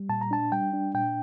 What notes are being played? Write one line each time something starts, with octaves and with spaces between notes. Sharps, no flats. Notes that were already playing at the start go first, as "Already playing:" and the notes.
Already playing: G3
A#2 A5
A#5
D4 A5
G3 G5
D4
A#2 G5